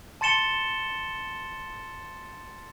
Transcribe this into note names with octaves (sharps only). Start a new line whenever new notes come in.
A5 C6 A6 C#7 E7 G7